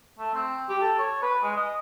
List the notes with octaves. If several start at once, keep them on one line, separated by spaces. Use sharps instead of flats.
A3
C4
G4
A4
C#5
B4
G#3
D#5